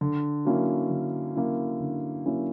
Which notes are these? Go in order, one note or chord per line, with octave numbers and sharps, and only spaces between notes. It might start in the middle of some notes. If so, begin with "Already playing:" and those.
D3
F#3 A#3 C#4 E4
D3
F#3 A#3 C#4 E4
D3
F#3 A#3 C#4 E4